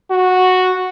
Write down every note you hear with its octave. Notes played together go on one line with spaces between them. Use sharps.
F#4